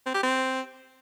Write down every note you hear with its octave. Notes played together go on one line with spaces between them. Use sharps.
C4
G4
C4